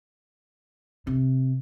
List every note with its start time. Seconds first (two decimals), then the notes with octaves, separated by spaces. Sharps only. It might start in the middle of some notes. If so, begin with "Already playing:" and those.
1.07 C3